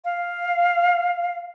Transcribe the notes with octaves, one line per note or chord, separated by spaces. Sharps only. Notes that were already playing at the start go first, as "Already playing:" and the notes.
F5